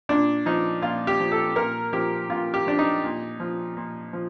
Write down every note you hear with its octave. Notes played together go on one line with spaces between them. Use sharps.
A#2 D4
F3 D#4
A#2 F4
G4
F3
A4
A#2 A#4
F3 G4
A#2 F4
G4
F3 D4
D#4
A#2
F3
A#2
F3